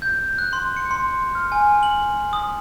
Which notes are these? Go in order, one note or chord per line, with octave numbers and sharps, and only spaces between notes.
G6
F#6
C6
C#7
C6
F6
G#5
F#7
D#6